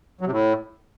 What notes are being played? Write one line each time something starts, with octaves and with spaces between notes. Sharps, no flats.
F#3
C3
A2